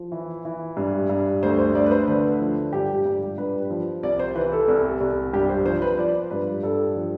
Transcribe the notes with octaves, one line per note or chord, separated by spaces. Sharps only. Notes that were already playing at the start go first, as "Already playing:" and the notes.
Already playing: F3
E3
E3
G2
G2
D2 C5
C5
D2 D5
B4
C5
D3 B4
F3
G2 G4
G2
G2 B4
F3
C2 D5
C5
E3 B4
A4
C2
C2
G2 G4
C5
F3 C5
B4
F3 D5
G2 B4
G2 A4
F3